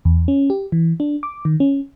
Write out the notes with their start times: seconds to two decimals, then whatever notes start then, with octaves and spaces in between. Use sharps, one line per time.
0.05 E2
0.28 C#4
0.50 G4
0.72 E3
1.00 D4
1.23 D6
1.45 D#3
1.60 C#4